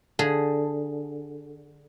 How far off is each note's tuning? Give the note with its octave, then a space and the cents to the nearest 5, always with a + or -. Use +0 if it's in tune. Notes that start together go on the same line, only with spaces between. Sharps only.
D3 +0 G#4 +0